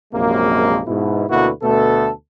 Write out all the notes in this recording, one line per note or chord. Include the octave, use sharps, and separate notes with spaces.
A#1 F#2 C3 G#3 A#3
G#2 B2 E4
D2 B2 A#3 E4 F#4 B4
D2 B2 A3 B3 A4